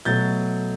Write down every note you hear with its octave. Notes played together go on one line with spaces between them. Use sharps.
B2 F#3 A3 G6 A6